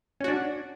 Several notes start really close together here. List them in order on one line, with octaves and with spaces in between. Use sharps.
C#4 F#4 D4